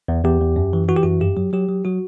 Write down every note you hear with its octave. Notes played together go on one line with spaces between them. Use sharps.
E2
E2 G4
E2
F#2
E3
E3 F#4
G4
F#2 F#4
G2 G4
F#3
F#3 G4
F#3
F#3 F#4